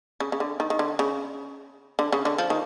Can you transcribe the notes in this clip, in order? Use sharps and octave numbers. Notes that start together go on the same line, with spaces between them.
C#3
C#3
D3
D#3
D#3
D3
C#3
D3
C#3
D3
F3
D#3